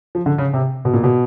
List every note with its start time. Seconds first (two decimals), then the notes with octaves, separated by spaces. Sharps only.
0.15 F3
0.26 D3
0.38 C#3
0.54 C3
0.85 B2
0.94 A#2
1.04 B2